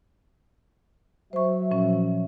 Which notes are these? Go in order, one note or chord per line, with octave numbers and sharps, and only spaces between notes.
F#3 C5 E5 C#6
A#2 F3 C#4